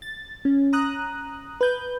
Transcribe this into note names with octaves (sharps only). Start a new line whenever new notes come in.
A6
C#4
A#5 D#6 F#6
B4 G6